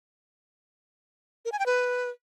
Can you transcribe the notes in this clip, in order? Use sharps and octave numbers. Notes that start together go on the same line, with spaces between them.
A#4
G#5
G5
B4